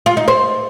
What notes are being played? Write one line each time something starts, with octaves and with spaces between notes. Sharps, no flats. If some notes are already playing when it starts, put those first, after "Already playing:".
F4
D#4
C5